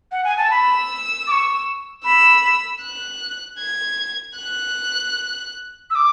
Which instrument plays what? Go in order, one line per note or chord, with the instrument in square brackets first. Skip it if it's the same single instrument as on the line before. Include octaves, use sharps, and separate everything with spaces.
[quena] F#5
G#5
A5
[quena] B5 [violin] E6
[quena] D6
C#6
[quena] B5 [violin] E6
[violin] F#6
G#6
F#6
[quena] E6
D6